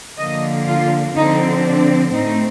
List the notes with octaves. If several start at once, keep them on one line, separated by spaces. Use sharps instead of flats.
D3 F3 A#3 D#5
F4
D3 F3 C4 D#4
D4
A2 A3 C4 D#4